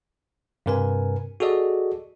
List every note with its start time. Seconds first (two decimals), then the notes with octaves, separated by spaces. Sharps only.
0.66 G2 C3 A#4 B4 G#5
1.40 F#4 G#4 A4 D5 D#5